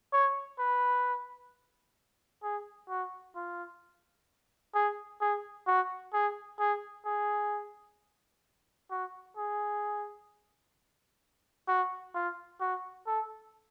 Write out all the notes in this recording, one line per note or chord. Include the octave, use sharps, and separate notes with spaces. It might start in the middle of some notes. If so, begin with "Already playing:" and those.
C#5
B4
G#4
F#4
F4
G#4
G#4
F#4
G#4
G#4
G#4
F#4
G#4
F#4
F4
F#4
A4